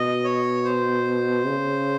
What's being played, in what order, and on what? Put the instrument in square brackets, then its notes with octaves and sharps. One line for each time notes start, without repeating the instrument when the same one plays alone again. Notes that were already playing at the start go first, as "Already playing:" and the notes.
Already playing: [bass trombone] B2 [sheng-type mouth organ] D#5
[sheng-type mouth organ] C#5
C5
[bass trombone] C#3